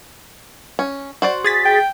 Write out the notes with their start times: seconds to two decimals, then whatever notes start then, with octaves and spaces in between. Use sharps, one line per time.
0.79 C#4
1.22 F#4 C5 D5
1.44 G#4 A6 B6
1.65 G5